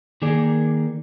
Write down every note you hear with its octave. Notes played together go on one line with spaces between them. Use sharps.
D#3 A#3 G#4 D5